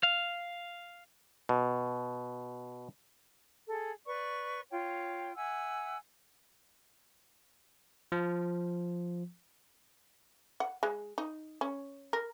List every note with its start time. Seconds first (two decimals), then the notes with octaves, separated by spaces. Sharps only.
0.03 F5
1.49 B2
3.69 G#4 A4
4.05 B4 D5 C#6
4.70 F4 C#5 G5
5.36 E5 F#5 G#5 E6
8.12 F3
10.60 F#5
10.83 G#3
11.18 D#4
11.61 C#4
12.13 A#4